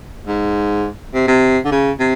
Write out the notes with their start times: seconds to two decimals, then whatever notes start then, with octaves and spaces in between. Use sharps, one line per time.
0.27 G#2
1.14 C3
1.28 C3
1.65 D3
1.71 C#3
2.00 C3